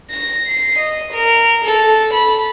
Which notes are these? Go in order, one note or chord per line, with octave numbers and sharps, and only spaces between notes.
A#6
C7
D#5
A#4
A4
B5